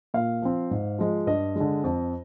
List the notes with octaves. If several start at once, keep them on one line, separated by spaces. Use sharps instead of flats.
A#2 F5
F3 C4
G#2
F3 G#3
G2 D#5
D3 G#3
F2